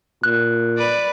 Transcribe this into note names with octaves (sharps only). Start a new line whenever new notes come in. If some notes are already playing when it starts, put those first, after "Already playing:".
A#2 F#6
B4 D5